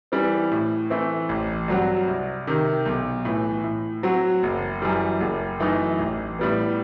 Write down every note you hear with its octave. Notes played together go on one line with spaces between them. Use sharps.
E3 G3 C4
A2
E3 A3 C4
A1
G2 F#3 C4 F#4
C2
C3 D#3
B1
A2 E3
A2
F#3 C4 F#4
F#1
F#2 E3 G3
F#1
F#2 E3 A3 D#4
A1
A2 G3 B3